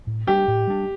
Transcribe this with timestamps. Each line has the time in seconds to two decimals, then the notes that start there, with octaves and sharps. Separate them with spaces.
0.07 A2
0.27 G3 D4 G4
0.48 A2
0.67 G3 D4